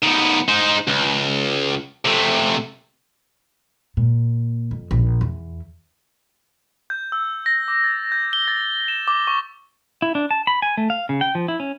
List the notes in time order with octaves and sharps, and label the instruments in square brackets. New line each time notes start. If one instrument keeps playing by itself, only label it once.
[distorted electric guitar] D#3 B3
D#4 C5
C#2
C3 A3
[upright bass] A#2
F2
A#1
E2
[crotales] G6
E6
A#6
D6
A6
G6
G7
A6
E7
D6
C#6
[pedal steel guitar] E4
D4
A5
B5
G#5
A3
F5
C#3
G5
F3
E4
C#4